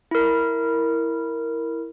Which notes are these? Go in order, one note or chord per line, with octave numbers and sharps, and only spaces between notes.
E4 A#4